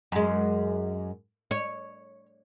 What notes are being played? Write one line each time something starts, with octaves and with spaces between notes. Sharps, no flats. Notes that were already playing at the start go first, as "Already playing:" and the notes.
F#2 G#3
C#5